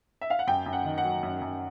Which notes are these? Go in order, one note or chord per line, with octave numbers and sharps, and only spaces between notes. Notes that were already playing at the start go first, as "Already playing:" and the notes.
E5
F5
F#5
F#2 G5
F#2
F#5
D#3
F#5
F#3
F#2
F#2